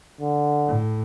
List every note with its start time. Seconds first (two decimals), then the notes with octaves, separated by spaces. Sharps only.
0.20 D3
0.67 A2